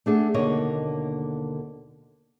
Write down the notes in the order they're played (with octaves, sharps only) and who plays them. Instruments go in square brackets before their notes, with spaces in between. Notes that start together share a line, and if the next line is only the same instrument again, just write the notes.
[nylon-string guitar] A3 D4 G#4 F#5
D#2 B2 D3 A#3 C#5 D#5